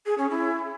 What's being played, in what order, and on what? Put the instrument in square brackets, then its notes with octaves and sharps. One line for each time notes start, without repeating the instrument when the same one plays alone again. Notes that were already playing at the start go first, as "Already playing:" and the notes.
[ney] G#4
C#4
E4